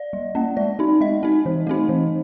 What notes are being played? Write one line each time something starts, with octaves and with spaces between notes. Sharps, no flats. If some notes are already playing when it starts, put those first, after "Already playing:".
Already playing: D5
G3
A#3 C#4
G#3 D5
C4 D#4
G#3 D#5
C4 D#4
E3
A3 C4 D#4
E3